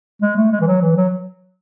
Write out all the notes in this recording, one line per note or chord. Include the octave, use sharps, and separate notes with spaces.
G#3
A3
G#3
E3
F#3
E3
F#3